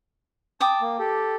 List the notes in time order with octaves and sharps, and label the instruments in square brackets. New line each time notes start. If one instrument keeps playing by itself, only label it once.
[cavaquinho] G5 D6 D#6 [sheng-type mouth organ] A5
[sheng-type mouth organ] A#3
G4 A4